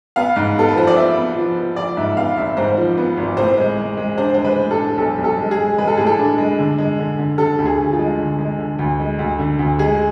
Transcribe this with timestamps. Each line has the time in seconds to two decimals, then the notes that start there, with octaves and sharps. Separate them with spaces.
0.16 B3 F5
0.36 G#2
0.56 B3 A4
0.68 B4
0.76 F3 C5
0.87 D5
0.96 B3 E5
1.17 B3
1.37 F3
1.57 B3
1.76 F3 D5
1.97 G#2 E5
2.17 B3 F5
2.37 G#1 E5
2.57 G#2 C5
2.77 F3
2.97 B3
3.17 G#1
3.37 A2 C5
3.58 G#3
3.78 G#3
3.97 G#3
4.18 D4 C5
4.34 G#3 C5
4.45 B4
4.58 A2
4.71 A4
4.78 D4
4.98 B1 A4
5.18 B1
5.24 A4
5.38 G#3
5.51 G#4
5.58 G#3
5.78 G#3 B4
5.87 A4
5.97 A2 G#4
6.06 A4
6.18 D4
6.38 G#3
6.59 D3
6.78 G#3
6.99 D3
7.19 D3
7.38 D3 A4
7.58 D2
7.65 G#4
7.78 D2
7.93 F4
7.99 G#3
8.19 D3
8.39 G#3
8.59 D3
8.79 D2
9.00 G#3
9.19 D2
9.39 D3
9.59 D2
9.79 G#3 G#4